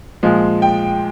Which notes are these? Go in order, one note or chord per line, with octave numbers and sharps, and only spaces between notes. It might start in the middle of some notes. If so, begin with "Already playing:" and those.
A#2 F3 G#3
G5